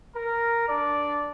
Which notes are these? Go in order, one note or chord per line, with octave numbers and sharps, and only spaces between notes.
A#4
D4 D5